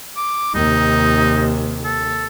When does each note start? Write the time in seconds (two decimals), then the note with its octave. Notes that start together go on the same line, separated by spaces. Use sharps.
0.17 D6
0.54 D#2 C3 D#4
1.84 A4